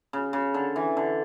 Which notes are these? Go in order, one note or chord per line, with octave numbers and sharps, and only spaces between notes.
C#3
C#3
D3
E3
D3